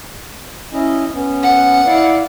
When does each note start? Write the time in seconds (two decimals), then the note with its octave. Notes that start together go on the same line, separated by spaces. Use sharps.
0.73 C#4 E4 D#5
1.13 B3 C#4
1.42 F#5
1.86 E4 D5 F5